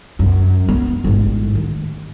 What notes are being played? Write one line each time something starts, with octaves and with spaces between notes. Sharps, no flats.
F#2
B3
A1 G#2
D#3